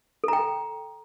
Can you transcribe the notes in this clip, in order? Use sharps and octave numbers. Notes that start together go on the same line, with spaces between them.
A4 G5 A#5